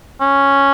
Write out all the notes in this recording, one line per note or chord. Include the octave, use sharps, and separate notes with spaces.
C#4